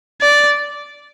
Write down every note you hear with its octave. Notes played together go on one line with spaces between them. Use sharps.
D5